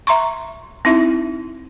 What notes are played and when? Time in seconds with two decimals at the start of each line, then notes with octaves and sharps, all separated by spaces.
0.07 E5 A#5 C6 C#6
0.85 C4 D#4 E4 E5